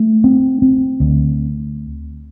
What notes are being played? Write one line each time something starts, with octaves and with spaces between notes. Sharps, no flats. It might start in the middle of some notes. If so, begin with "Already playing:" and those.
Already playing: A3
C4
C4
D2